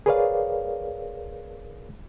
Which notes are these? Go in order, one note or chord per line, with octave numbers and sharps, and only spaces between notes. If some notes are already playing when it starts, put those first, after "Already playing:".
G#4 A#4 B4 C#5 D5 F5